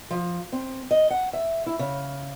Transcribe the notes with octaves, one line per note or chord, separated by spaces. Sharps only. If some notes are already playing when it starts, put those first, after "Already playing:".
F3
C4
D#5
F#5
E5
E4
C#3